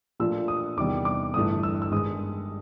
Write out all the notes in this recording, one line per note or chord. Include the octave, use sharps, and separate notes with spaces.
A#2 F3 A3 D4 F4 E6
D#6
E2 C3 D#3 G3 D6
D6
G1 G2 E3 A3 D#6
E6
E6
G2 D#3 G#3 D#6